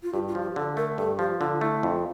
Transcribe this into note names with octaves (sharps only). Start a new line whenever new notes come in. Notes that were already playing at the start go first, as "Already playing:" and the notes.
F4
G2 G4
F4
F3
G4
D3 A4
A3 A#4
G2 A4
F3 G4
D3 F4
A3 E4
F2